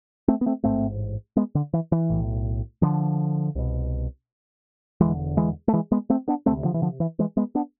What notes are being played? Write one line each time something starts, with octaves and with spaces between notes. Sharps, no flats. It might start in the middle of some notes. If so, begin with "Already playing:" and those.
A3 C4
B3
A3 C4
A1 G#2 A3 C4
G#3 B3
D3
E3
E3
B1 A2
D3 F3
C2 B2
E1 E2 D3 E3 G#3
E3 G#3
A3
E3 G#3
G#3 B3
A3 C4
B3 D4
D2 C3 A3 C4
D3 F3
E3
D3 F3
E3
E3 G#3
G#3 B3
B3 D4